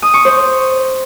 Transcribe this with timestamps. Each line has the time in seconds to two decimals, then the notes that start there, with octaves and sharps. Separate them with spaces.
0.02 D#6
0.14 C#6
0.25 C5